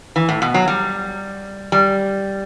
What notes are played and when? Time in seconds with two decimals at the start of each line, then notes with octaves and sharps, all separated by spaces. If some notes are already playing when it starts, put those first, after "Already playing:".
0.16 E3
0.29 A2
0.42 B2
0.54 F#3
0.68 G3
1.72 G3